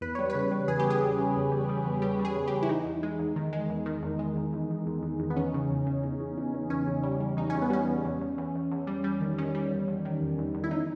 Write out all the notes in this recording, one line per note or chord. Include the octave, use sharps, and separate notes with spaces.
E2 B4
G3 C#5
C#3 B4
G3
E2 G#4
G4
E2 G#4
G3
C#3
E2
G3
G3
E2
G3 G4
G3
G#4
E2
E2 G4
E4
E2 D#4
E2
G#3
E2
D#3
G#3
E2
D#3
E2
G#3
E2
E2
E2
E2
E2
E2
B3
E2 C#4
C#3
E2
C#3
E2
E2
E2
E2
E2 C#4
E2
G3
G3
E2 D#4
E2 C#4
B3
G3 C#4
E2
E2
E2
E2
E2
E2
G3
G3
D#3
D#3 C#4
G3
E2
E2
D#3
E2
E2
E2
E4
D#4